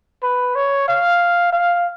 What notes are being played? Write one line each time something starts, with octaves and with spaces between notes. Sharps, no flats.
B4
C#5
F5
F5